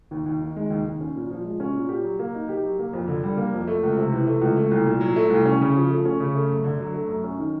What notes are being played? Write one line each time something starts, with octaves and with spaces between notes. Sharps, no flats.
D#2
D#2
D#3
G#3
D#2
D#2
C#4
A#2
F3
G#3
C#4
A#2
G4
F#3
A#3
D#4
G4
F#3
A#3
F2
D3
G3
A#3
F2
A3
C#2
C3
E3
A3
C#2
A3
C2
A#2
F#3
A3
C2
C#4
C#3
F3
A3
C#4
C#3
A3
F#2
D3
F#3
A3
F#2
C#4
D#3